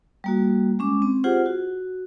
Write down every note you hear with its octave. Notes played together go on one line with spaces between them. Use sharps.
G3 A#3 F#4
G#3 C#4 D6
C4
F4 G4 G#4 C5 F#5
F#4